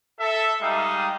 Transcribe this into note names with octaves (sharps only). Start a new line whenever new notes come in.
A4 E5
G3 G#3 D#4 F5 D#6